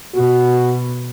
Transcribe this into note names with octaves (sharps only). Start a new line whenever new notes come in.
B2 F#4